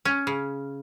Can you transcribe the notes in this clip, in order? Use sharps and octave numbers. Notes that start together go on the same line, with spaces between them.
C#4
C#3